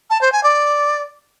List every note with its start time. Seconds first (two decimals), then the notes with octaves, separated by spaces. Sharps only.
0.10 A5
0.21 C5
0.32 G#5
0.43 D5